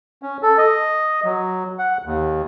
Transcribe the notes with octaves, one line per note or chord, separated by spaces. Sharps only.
C#4
A4
D#5
F#3
F#5
D#2